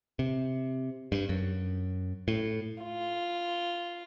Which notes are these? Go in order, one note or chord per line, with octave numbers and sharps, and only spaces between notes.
C3
G2
F#2
A2
F4